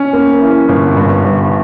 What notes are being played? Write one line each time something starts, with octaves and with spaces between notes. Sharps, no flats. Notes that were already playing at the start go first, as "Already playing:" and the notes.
Already playing: C#4
A#3
E3
G1
G2
G1